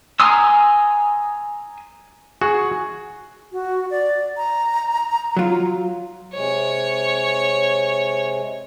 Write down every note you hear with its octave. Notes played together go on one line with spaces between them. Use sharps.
G#5 A#5 C6 D#6 E6
F#4 G#4
F#4
D5
A#5
F#3 F4
C3 G#3 C#5